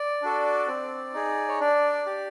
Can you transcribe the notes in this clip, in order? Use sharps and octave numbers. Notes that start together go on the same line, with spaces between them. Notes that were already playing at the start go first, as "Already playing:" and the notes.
Already playing: D5
D4 F#4 A4
C4
D#4 G#4
C#5
D4 D5
G4